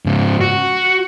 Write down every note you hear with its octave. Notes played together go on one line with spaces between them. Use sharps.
G#2 C#3
F#4